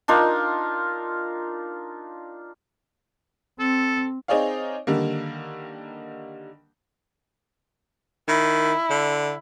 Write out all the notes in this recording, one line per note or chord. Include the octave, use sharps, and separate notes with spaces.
D4 D#4 F4 A#4
C4 A4
C4 D#4 G#4 C#5 D5 F5
D3 D#3 G3 A#3
D#3 E4
D3